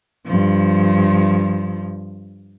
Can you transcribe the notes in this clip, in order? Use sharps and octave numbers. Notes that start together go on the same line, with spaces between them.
G2 F3